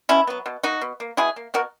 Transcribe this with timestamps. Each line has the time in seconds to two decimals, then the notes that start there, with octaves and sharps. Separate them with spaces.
0.09 B2 C#4 E4
0.27 F#3 B3
0.46 B2
0.63 A#3 D#4 F#4
0.81 B2
1.00 A#3
1.17 B2 E4 G#4
1.36 A#3
1.54 B2 F#4 A#4